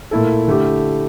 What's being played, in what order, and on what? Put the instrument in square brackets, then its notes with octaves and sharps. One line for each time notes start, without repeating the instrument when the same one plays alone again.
[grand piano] A#2 A3 E4 A4
D3 A3 E4 G4